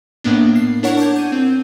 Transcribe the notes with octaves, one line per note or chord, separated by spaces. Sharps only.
A2 A#3 B3 D4
C7
D4 E4 A#4 C#5 F#5 C#6
A5 D6 G6 G#6
G6 D#7
C4